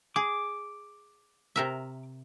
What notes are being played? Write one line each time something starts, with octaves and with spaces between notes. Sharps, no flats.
G#4 D6
C3 A#4 E5